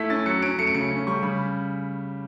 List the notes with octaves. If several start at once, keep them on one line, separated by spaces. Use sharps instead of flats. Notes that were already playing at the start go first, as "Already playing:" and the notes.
Already playing: A3 E4 B6
C#4 A6
F#3 C#7
C#4 D7
A3 C#7
D7
C#3 C#7
C#4
G3 C#6
C#3 B5